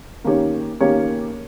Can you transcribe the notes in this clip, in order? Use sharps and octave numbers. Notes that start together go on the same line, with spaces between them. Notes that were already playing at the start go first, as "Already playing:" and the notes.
D#3 A#3 C#4 G4 C#5
D#3 A#3 C#4 G4 C#5